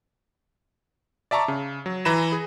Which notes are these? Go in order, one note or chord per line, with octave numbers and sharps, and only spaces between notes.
D5 E5 A5 A#5 C#6 D6
C#3
F#3
E3 A#5 B5 A#6 E7
G#4